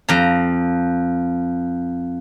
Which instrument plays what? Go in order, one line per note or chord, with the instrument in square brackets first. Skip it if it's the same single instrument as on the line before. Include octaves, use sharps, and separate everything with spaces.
[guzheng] F2 A#5